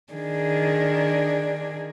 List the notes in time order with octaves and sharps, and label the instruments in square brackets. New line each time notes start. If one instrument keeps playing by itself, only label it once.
[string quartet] D#3 D4 G#4